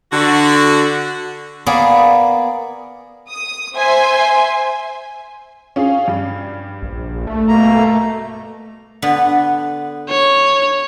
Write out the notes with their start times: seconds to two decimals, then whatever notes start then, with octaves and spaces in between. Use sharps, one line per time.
0.12 D3 F#4
1.66 A#3 B3 G#4 D5
3.30 D#6
3.75 C5 E5 G#5 C6
5.76 C#4 F4 G#4
6.08 G2 G3
6.82 A#1
7.27 A3
7.48 B2 A#3 A#5
9.02 D3 B3 B4
10.09 C#5